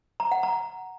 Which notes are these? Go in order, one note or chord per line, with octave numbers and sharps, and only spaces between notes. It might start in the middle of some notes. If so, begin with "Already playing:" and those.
A#5
F#5
A#5